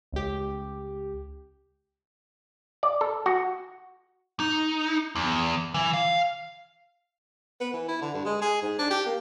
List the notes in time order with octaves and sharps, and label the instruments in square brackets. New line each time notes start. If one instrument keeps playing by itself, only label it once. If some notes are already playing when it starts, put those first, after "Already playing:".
[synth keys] C#2 G4
[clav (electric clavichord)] D5
A4
F#4
[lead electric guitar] D#4
E2
E3
F5
[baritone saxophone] B3
E3
E4
D3
G2
G#3
G#4
G#2
D4
G4
A#3